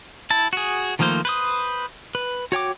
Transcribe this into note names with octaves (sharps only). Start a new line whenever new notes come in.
E4 A5
F#4 G#4
D#3 F3 A3 A#3 C5
B4 C5 D#6
B4
F#4 C#5 G5 D6